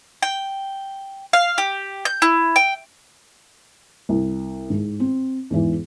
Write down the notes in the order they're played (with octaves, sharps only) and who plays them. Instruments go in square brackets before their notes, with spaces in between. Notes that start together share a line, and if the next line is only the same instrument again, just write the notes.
[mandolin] G5
F5
G4
G6
E4
G5
[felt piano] C2
G#2
C4
E2 G#2 E3